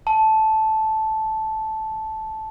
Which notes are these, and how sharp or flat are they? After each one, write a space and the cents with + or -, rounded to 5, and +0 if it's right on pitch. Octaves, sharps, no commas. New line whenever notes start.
A5 -10